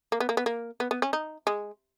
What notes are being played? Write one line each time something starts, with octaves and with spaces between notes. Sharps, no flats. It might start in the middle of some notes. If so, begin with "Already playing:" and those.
A#3
B3
A#3
B3
A#3
B3
B3
C#4
D#4
G#3